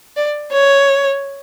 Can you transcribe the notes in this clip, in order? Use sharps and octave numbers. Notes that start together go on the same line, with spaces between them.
D5
C#5